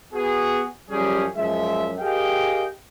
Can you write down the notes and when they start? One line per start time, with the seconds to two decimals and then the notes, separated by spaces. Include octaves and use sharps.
0.14 B3 F#4 G#4
0.90 F#2 F3 G3 C#4 G4 G#4
1.36 F#2 F3 G#3 E5
1.98 G4 G#4 A#4 D#5 F5 G5